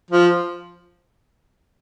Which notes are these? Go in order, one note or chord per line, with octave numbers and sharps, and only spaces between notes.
F3